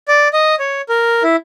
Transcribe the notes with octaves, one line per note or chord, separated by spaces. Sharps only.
D5
D#5
C#5
A#4
E4